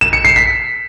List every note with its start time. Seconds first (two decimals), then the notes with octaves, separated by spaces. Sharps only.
0.01 E7
0.13 C#7
0.25 C7
0.36 B6